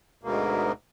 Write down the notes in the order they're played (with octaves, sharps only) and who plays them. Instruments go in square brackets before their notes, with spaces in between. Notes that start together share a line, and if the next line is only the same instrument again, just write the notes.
[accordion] D2 G#2 B2 A#3